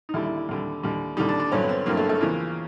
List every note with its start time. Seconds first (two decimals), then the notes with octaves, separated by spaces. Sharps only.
0.09 D#4
0.14 D#2 D3 G3 E4
0.25 E4
0.37 E4
0.49 D#2 D3 G3
0.83 D#2 D3 G3
1.17 D#2 D3 G3 D#4
1.29 D4
1.40 D4
1.52 G2 D3 F#3 C#4
1.61 B3
1.69 C4
1.86 G2 D3 F#3 A#3
1.97 A3
2.09 A3
2.21 E2 C#3 F3 G#3 A#3